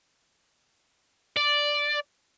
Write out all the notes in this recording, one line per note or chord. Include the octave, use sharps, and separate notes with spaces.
D5